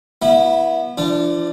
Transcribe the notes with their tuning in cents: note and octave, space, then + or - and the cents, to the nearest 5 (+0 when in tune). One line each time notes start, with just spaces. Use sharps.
B3 -30 E4 -5
F3 -40 D4 +0